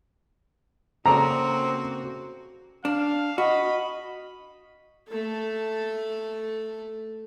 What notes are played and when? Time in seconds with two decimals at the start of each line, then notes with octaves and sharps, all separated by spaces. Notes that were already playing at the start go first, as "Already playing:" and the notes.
1.06 C#3 A#3 C4 F#4 A4 D5 A#5
2.85 D4 F5
3.38 F#4 D#5 B5
5.09 A3 A4